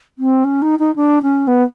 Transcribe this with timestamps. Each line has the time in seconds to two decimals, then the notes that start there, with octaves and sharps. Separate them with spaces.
0.19 C4
0.44 C#4
0.62 D#4
0.79 D#4
0.96 D4
1.23 C#4
1.47 B3